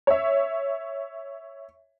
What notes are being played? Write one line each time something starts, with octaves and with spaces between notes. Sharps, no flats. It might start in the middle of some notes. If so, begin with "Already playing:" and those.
C#5 E5